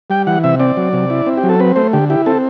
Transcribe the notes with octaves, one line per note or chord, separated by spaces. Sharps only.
G3 G5
E3 F#5
C3 E5
C4 D5
F#3
C3
E4
C4
G4
F#3
A4
C4 B4
A3 C5
D3 G4
E4 G4
C4 A4